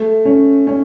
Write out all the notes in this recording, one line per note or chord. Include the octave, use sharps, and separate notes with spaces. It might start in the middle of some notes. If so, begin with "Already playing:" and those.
Already playing: A3
C#4
C#4